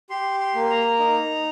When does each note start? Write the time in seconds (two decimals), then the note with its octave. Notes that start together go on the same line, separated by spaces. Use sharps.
0.10 G4 C6
0.40 C6
0.55 A#3
0.70 A#5
0.99 D#4